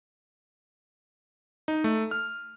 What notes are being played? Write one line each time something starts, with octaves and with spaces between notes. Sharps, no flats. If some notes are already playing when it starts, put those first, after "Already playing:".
D#4
A3
F6